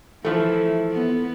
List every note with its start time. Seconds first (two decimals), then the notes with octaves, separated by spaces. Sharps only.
0.25 E3 F3 A3
0.92 B3